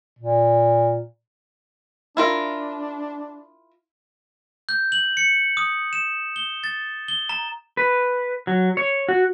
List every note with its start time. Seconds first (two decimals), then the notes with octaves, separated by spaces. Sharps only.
0.19 A#2
2.17 D4 E4 F4 A#4
4.69 G6
4.92 F#7
5.17 C#7
5.57 D#6
5.93 E7
6.36 G7
6.64 A6
7.08 G7
7.29 A#5
7.77 B4
8.47 F#3
8.77 C#5
9.09 F#4